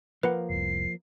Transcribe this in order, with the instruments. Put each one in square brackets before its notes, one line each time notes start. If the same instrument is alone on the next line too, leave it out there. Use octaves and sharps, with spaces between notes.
[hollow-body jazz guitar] F3 A#3 [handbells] B4 F#5
[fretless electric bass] F1 C2 [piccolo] C7